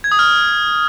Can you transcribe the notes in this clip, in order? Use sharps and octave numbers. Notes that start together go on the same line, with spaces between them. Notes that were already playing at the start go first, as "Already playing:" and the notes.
G#6
D#6
F6